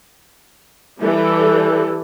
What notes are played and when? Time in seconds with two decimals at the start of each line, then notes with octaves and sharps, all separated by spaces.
1.00 E3 G3 A4